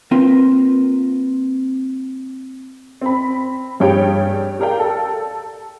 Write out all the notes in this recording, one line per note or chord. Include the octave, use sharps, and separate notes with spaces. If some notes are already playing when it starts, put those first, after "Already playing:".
A#3 C4 F4 A#4 B4
C4 B5
G2 G3 G#4 C#5 G5 D7
G4 G#4 A#4 D5 F5 G5
A4